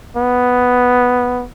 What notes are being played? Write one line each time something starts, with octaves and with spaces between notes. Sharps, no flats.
B3